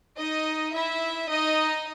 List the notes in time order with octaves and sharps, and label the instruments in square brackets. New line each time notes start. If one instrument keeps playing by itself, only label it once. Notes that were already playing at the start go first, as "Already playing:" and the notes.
[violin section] D#4 D#5
E4 E5
D#4 D#5